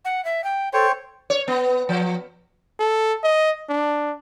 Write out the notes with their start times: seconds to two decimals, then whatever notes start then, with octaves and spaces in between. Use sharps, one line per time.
0.05 F#5
0.25 E5
0.44 G5
0.73 A4 C5 C#5 G5
1.30 C#5
1.48 B3
1.89 F3
2.80 A4
3.24 D#5
3.69 D4